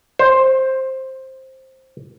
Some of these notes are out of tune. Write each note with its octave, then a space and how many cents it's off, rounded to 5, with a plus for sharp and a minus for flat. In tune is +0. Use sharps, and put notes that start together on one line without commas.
C5 +10